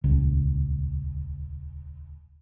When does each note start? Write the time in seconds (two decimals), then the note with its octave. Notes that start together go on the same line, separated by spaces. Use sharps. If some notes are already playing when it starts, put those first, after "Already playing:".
0.04 D#1 C#2